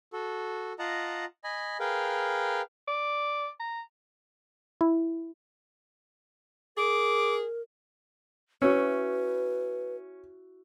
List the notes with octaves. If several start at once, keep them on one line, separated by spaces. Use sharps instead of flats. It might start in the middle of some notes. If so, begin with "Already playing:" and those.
F#4 A4
F4 D#5 F#5 A5 A#5
D#5 G#5 B5
G#4 A#4 B4 F5 G5
D5
A#5
E4
G#4 A#4 D6
C#4 E4 F#4 B4